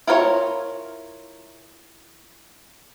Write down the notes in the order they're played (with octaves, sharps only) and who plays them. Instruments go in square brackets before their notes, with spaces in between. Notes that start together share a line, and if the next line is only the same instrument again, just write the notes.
[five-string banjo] E4 F4 A#4 C5 C#5